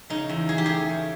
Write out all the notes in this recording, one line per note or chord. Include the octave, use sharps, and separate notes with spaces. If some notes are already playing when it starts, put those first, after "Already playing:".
C#3 D#4
E2
E2 G#4
G4
A3 G#4
C#3